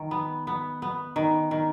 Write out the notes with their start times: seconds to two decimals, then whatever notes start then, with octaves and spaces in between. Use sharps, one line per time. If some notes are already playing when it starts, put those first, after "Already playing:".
Already playing: D#3
0.11 B3
0.47 B3
0.82 B3
1.16 D#3
1.51 D#3